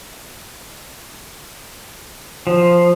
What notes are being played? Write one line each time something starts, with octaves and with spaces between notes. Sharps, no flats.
F3